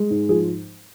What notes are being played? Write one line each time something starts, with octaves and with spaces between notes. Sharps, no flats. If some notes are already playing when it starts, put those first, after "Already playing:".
Already playing: G#3
G#2
F3 G#4